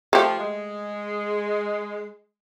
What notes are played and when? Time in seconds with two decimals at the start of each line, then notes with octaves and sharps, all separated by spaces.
0.13 F3 A3 G4
0.38 G#3